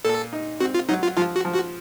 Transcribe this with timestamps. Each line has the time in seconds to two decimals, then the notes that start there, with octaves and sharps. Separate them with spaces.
0.05 A#2 A4
0.33 D#4
0.60 C4 F#4
0.74 F4
0.89 F#3 D#4
1.03 F4
1.17 F3 F4
1.36 F#4
1.45 F3
1.54 F#4